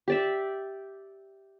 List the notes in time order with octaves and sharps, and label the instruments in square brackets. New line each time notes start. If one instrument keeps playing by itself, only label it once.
[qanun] G4 D5 E5